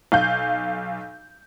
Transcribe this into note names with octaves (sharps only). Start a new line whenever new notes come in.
B1 F5 G6